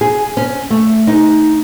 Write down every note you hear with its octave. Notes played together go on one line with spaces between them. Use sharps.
G#4
C#4
A3
D#4